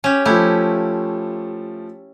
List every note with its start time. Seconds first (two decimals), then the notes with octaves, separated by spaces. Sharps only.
0.04 C#4 G4
0.25 F3 A3 E4 G4